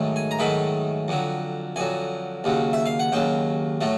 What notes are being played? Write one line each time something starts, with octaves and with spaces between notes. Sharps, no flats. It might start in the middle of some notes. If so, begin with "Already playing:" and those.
Already playing: G#2 D#3 F#3 A3
G#5
A#5
G#2 D#3 F#3 A3 B5
F2 D3 F#3
F2 D3 F#3 G#5
D#2 C#3 F#3
E5
F5
F#5
D#2 C#3 F#3 G5
A2 F#3 A3